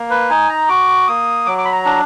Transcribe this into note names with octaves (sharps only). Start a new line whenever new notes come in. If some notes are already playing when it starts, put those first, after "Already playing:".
Already playing: A#3
B4
D#4 G#5
A#5
F#4 D6
A#3 D#6
F#3 D6
D6
B5
A#5
D4